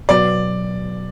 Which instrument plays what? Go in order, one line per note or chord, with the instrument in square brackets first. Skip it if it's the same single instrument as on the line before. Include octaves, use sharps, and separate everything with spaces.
[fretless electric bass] B2 F#3 B3 [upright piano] D5